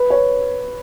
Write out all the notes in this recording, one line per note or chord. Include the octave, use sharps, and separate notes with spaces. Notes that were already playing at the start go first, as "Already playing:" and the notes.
Already playing: B4
C#5